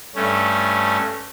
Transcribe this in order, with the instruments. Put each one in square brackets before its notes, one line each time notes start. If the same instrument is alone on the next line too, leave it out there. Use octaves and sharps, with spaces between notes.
[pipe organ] G2 A3 C#4